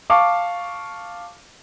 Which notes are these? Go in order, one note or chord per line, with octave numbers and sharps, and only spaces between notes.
F5 A5 C#6 D6